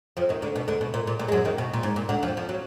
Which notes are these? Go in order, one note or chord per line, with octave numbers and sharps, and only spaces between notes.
F2 F3
D#2 D#3
D2 D3
B2
D2 D3
B2
A#2
A#2
A#2
G#3
F#2 F#3
D#2 D#3
B2
A#2
G#2
A#2
D2 D3
F2 F3
F3
F#3